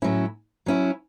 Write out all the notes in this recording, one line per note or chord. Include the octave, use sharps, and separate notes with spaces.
A2 F#3 C#4 E4
F#3 C#4 E4